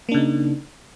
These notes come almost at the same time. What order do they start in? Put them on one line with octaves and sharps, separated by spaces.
A#3 D4 C#3 D#4